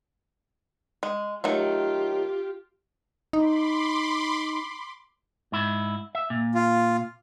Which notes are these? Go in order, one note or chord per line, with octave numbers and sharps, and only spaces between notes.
G#3
D#3 F#3 A3 F4 G4
D#4 B5 C6 D6
G#2 E4
E5
A#2
F4